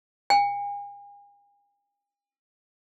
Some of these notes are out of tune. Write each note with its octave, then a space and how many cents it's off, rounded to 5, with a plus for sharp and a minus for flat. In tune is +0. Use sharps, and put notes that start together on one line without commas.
G#5 -45